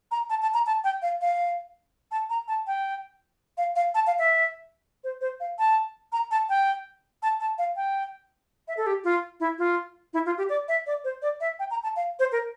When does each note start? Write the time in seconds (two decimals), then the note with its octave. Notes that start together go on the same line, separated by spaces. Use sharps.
0.11 A#5
0.30 A5
0.42 A5
0.54 A#5
0.67 A5
0.84 G5
1.02 F5
1.21 F5
2.11 A5
2.30 A#5
2.48 A5
2.67 G5
3.58 F5
3.76 F5
3.95 A5
4.07 F5
4.19 E5
5.04 C5
5.21 C5
5.40 F5
5.59 A5
6.12 A#5
6.31 A5
6.49 G5
7.23 A5
7.40 A5
7.58 F5
7.76 G5
8.68 E5
8.77 A4
8.87 G4
9.04 F4
9.40 E4
9.59 F4
10.14 E4
10.26 F4
10.38 G4
10.49 D5
10.68 E5
10.87 D5
11.04 C5
11.22 D5
11.41 E5
11.59 G5
11.71 A#5
11.83 A5
11.96 F5
12.19 C5
12.32 A#4